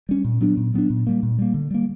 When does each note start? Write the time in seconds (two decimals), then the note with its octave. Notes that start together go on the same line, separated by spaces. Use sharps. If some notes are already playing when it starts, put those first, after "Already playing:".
0.09 G3 C#4
0.24 A#2
0.41 F#3 B3 D4
0.57 A#2
0.74 F#3 B3 D4
0.90 A#2
1.07 G3 A#3
1.23 A#2
1.39 G3 A#3
1.54 D3
1.71 G3 A#3